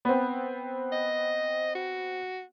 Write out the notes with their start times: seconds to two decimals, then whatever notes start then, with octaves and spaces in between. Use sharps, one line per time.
0.05 B3 C4
0.92 D#5
1.75 F#4